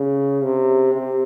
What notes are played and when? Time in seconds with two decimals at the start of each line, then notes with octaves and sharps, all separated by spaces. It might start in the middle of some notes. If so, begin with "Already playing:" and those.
Already playing: C#3
0.43 C3
0.93 C3